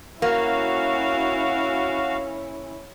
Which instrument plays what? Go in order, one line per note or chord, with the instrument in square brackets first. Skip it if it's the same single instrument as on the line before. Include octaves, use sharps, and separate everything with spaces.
[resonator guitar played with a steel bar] A#3 [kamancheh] C#4 E4 [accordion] F#4 F5